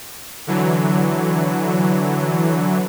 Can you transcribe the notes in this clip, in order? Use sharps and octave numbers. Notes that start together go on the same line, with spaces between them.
D3 E3 F#3